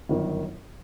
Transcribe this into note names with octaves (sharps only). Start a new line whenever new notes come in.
G1 F#2 D#3